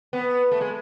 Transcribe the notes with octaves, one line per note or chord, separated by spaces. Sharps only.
B3
A3
G#3